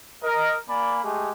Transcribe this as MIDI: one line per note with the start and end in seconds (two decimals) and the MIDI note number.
0.23 0.54 70
0.23 0.54 75
0.69 0.99 58
0.69 0.99 74
0.69 0.99 80
0.69 0.99 83
1.03 1.31 56
1.03 1.31 57
1.03 1.31 67
1.03 1.31 68